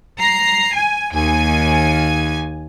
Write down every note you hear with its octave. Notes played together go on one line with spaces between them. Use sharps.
A#5 C7
G#5
D#2 G#5